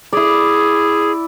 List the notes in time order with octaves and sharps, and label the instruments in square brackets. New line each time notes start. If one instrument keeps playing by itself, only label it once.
[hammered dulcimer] E4 D5 [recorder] G#4